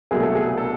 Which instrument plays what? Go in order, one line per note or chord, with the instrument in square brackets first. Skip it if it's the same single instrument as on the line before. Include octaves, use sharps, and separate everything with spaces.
[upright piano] C2 B2 F#3 A3 G#4
A4
G#4
A4